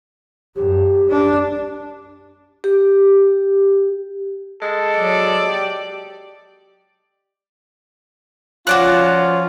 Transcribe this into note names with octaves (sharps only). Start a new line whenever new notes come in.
F#2 G4
D4
G4
G#3 A4
F#3 D5
G4
F3 C#4 F4 F#4 D5 F#6